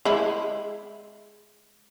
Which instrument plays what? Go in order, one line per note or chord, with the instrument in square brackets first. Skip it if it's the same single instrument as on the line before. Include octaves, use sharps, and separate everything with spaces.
[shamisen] G#3 E4